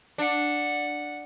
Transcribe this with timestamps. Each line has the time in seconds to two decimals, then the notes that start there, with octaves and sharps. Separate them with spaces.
0.18 D4 F#5